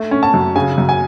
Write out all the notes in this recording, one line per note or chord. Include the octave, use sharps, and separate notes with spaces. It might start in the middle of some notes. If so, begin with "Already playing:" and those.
Already playing: A3
C#4
A5
F#2
C#3 G#5
F#2
G#5